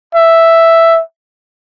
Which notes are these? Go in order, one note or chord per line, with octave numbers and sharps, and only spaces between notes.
E5